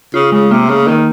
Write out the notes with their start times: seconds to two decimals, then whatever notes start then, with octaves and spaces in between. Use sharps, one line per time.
0.14 C#3 F4
0.32 C#3 G#3
0.51 C3 A#3
0.69 C#3 A#3
0.88 D#3 A#3